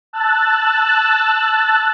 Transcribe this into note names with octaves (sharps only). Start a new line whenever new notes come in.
A5 E6 F#6 A6